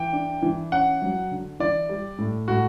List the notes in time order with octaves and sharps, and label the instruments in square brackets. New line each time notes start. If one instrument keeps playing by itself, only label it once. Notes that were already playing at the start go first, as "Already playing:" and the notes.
Already playing: [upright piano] E3 [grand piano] G5
[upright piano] D4
E3
[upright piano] C#4 [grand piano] F#5
[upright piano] F#3
D3
[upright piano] E3 [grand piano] D5
[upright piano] G3
A2
[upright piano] A2 [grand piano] F#4